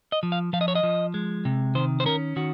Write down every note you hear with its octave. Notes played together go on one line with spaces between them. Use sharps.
D#5
F3
F5
F3 F5
D#5
C#5
D#5
F3
G#3
C3
D#3 C5
C5
C#4 A#4
D#3 F#4